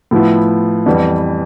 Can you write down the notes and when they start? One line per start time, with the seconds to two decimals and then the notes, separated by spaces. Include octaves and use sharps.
0.11 A2 F3 B3 E4
0.86 F2 E3 G3 B3